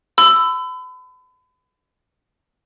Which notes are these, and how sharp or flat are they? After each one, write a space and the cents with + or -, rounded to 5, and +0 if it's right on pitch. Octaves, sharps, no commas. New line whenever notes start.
B5 +40 E6 +5